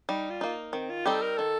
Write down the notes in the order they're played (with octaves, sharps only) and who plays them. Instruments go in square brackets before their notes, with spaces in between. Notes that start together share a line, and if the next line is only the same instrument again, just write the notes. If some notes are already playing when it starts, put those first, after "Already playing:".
[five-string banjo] G3 [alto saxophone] D#4
[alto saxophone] F4
[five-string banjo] A#3 D#4
[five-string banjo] D#3 [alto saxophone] C4
[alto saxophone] F4
[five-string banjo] G3 C4 D#4 G4 [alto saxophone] A4
[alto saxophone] A#4
[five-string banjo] D#3 [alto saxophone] A4